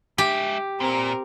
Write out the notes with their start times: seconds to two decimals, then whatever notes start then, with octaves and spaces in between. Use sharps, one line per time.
0.18 G#3 G4 E5
0.80 A#2 C4 A#4